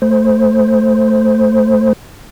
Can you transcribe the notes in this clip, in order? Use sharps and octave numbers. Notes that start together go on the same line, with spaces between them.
A3 C5